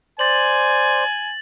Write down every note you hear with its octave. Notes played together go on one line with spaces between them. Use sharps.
C5 D5 G#5 A6 F#7